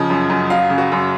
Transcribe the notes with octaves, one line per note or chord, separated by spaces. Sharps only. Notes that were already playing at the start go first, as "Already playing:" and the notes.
Already playing: C#3 F3 D#5
F#2
F#2
F#3 F5
C#3
F#4
F#2